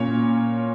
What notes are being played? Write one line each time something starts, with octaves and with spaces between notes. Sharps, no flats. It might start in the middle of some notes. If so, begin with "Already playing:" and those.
Already playing: A#2 A#3 C#4 C#5